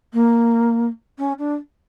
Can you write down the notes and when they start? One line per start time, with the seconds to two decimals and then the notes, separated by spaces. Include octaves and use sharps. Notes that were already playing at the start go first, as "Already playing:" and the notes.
0.13 A#3
1.18 C#4
1.39 D4